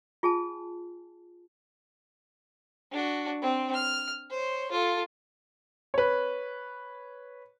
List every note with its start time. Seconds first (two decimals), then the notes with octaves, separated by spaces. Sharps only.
0.23 F4 G#4 G#5 A5
2.92 D4 F#4
3.42 C4
3.74 F6
4.30 C5 C#5
4.71 F4 A4
5.94 B4 C#5